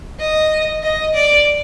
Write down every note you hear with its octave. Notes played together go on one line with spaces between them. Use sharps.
D#5
D#5
D5